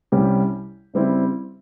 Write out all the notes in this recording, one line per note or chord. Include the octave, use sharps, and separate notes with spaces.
C2 C3 G3 C#4 G4
C#3 G3 C4 E4